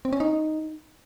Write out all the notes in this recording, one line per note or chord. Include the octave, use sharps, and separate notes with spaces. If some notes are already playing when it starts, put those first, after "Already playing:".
C4
C#4
D#4